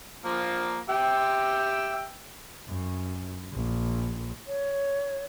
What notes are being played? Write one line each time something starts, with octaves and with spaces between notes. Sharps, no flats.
F3 A#3
G4 E5 G5
F#2
A#1
C#5